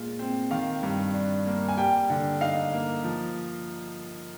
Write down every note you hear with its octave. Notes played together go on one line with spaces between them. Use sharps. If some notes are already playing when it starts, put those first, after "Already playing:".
Already playing: A#2 G#3 F4
C4
D#3 F5
G2
D4
A#3
G#5
G3 G5
D3
D#4 F5
A#3
F3